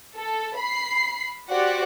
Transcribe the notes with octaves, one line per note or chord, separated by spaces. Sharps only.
A4
B5 C7
F#4 G4 C5 D5 F#5